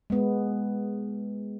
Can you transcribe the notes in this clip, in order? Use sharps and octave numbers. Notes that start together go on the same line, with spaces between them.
G#3 B3